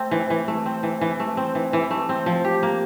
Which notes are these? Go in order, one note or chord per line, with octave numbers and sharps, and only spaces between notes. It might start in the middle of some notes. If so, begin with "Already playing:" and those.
Already playing: A3 C4
E3
E3
A3
C4
E3
E3
A3
C4
E3
E3
A3
C4
F3
G4
A#3